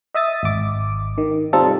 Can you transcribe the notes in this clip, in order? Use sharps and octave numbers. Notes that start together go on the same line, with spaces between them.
D#5 E5 D#6 A6
G#1 D6
D#3
C3 G3 C4 D#4 F4 A4